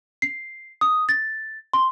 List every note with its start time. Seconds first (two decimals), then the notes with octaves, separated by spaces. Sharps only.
0.22 C7
0.81 D#6
1.09 A6
1.73 C6